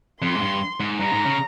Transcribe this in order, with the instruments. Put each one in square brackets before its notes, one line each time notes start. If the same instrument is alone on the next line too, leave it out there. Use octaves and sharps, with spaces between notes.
[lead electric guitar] F2 [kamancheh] C6
[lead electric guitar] G#2
G2
G#2
[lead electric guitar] G2 [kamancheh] A#5
[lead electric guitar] G#2
C#3